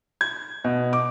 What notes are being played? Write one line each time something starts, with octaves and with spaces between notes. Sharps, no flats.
G#6
B2
D6